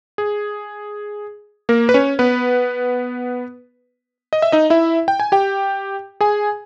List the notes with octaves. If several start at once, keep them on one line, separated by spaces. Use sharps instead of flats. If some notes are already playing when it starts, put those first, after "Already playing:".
G#4
A#3 A#4
B4
C#4 C#5
B3 B4
D#5
E5
D#4 D#5
E4 E5
G5
G#5
G4 G5
G#4 G#5